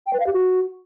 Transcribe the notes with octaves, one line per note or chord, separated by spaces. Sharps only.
G5
B4
F5
G4
F#4